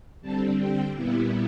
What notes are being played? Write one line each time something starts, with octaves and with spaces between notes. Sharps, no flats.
D3 G3 C4 A5
G5
A#2 G3 B3 E4